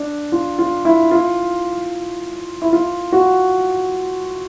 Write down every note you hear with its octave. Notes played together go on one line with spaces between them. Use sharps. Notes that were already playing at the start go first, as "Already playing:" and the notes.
Already playing: D4
F4
F4
E4
F4
E4
F4
F#4